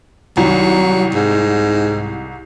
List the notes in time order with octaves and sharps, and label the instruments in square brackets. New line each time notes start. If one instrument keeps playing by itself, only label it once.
[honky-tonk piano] C2 D#3 [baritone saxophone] F#3
[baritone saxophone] G#2